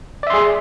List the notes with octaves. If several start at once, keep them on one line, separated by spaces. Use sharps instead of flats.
G#4 D5 E5 C6